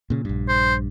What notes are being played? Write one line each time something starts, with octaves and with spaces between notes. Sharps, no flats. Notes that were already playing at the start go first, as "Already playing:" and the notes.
A#2 C#3
A#1 G2
C5